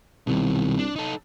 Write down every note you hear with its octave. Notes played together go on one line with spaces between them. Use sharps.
C2 B2 D#3
D4
D#4 A4